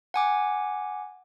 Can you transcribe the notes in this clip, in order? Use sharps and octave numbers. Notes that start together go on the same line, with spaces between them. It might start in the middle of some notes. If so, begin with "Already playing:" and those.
F#5 G#5 D6